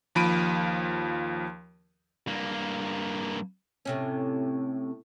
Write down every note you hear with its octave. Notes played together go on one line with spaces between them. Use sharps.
D#2 F3 B5 D7 D#7
G2 A#3
A2 C3 C#4